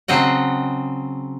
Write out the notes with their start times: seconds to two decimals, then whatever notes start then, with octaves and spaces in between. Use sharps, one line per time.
0.08 C#3 F#3 C4 D#5 F#5